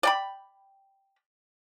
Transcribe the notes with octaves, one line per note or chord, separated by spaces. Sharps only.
D5 G5 B5